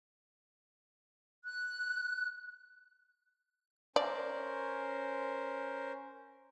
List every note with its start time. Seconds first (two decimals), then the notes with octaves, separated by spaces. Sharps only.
1.44 F#6
3.96 C#4 A#4 C5 D5